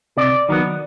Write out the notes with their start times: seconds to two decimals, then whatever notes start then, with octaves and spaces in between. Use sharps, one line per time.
0.17 C3 D5
0.49 D#3 F#3 B3